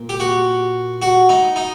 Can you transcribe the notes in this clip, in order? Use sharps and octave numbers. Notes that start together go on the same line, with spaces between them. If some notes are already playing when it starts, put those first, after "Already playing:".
Already playing: A#2
G4
F#4
F#4
D#4
D#4